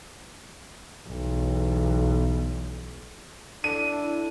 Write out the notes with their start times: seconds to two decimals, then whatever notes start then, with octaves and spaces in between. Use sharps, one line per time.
1.08 B1 E2
3.64 D4 E4 A4 D#7